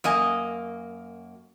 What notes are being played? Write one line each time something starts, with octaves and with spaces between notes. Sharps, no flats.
F#2 A#3 D#5 G#5